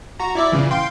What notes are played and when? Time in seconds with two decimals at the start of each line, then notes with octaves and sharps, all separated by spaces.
0.20 F#4 A#5
0.35 E4 D5 E5
0.52 A#2 C#3 E3
0.71 F5 G5 C6